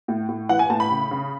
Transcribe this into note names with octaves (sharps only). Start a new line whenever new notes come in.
A2
A2
E3 F#5
G#5
A2 A5
B5
C#3
C#3